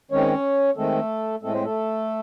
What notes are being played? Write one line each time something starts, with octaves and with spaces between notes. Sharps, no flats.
D#3 G#3 C4 C#4 C#5
D#3 G#3 A3 C4 A4
A2 G#3 A3 C4 A4
C4 C5
A3 A4